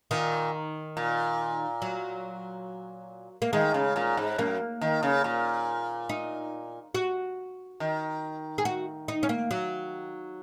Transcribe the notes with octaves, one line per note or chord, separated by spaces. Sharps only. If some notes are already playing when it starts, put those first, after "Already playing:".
A#2 D#3
A#2
F#3
A#3
D#3 G#3
C#3
A#2
G#2
F#2 A#3
D#3
C#3
A#2
D#4
F#4
D#3
G#4
F#4
D#4
C#4
A#3
F#3